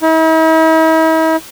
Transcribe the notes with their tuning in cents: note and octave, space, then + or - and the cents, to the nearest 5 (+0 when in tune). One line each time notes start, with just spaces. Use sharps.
E4 -45